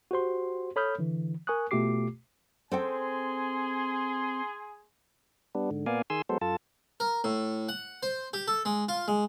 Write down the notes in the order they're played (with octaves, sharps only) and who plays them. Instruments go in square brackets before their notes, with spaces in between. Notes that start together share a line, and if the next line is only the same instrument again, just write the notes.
[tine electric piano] F#4 G4 C5 C6
A4 C#5 B5 D#6 F6 G6
D3 E3
A#4 G#5 C#6 D#6 F#6
B2 A3 F4 G4 D6 C7
[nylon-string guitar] C4 A4 G5 [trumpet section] G#4 G#5 C6
[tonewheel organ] G3 B3 D4
G#2 D3
A#2 A#3 B3 D5 F5 G#5
D#3 G#4 G#5 C6 E6
F#3 G#3 B3 A4 C5
F#2 F4 A4 A5
[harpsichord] A#4
A2
F#5
C5
G4
A4
G#3
F4
G#3